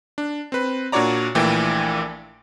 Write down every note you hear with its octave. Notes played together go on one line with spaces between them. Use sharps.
D4
C4 B4
A#2 D4 F#4 C#5 D5 A#5
A#1 A#2 E3 A3 G5